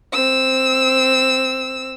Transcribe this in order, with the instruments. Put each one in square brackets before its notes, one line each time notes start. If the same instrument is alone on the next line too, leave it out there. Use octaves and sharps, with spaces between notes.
[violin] C4 E6